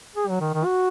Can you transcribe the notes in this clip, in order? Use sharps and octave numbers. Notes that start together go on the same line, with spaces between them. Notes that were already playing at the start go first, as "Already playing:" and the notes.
G#4
F#3
D#3
D#3
F#4